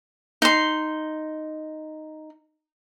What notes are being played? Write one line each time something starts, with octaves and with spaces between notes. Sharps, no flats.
D#4 C6